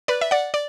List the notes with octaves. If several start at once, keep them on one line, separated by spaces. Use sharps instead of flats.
B4 D5
E5
D5 F#5
D5